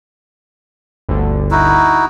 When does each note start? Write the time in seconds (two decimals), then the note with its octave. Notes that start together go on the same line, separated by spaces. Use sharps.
1.09 G1 D2 D3
1.51 D#4 E4 F#4